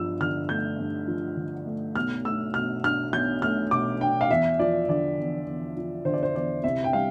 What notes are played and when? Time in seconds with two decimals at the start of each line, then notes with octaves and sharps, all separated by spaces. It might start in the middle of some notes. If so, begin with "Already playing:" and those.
Already playing: G2 F3 E6
0.21 D3 F6
0.49 A3 G6
0.78 G2
1.08 F3
1.37 D3
1.66 A3
1.95 B1 F6
2.25 A3 E6
2.54 B2 F6
2.83 D4 F6
3.13 B1 G6
3.42 A3 F6
3.71 B2 D6
4.01 D4 G5
4.21 F5
4.30 E2 E5
4.59 F3 D5
4.88 D3 D5
5.18 E2
5.47 E2
5.77 F3
6.05 D3 C5
6.13 D5
6.23 C5
6.34 E2 D5
6.64 C2 E5
6.84 G5
6.93 G3 F5